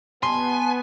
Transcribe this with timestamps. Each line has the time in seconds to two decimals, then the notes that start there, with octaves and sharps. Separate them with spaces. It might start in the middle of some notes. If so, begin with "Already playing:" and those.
0.23 B3 G#5 A5 C6